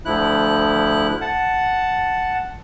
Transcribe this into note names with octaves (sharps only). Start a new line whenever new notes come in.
D2 F3 E4 F#6
F#5 A5